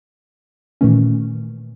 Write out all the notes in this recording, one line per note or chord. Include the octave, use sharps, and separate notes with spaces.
A#2 D#3 E3 A3 C#4